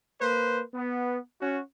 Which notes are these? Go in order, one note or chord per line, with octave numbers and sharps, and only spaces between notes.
A#3 B4 C5
B3
C#4 F#4